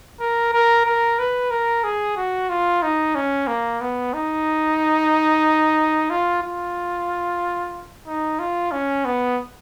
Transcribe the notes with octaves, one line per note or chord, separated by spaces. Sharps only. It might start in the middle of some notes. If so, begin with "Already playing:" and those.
A#4
A#4
A#4
B4
A#4
G#4
F#4
F4
D#4
C#4
A#3
B3
D#4
F4
F4
D#4
F4
C#4
B3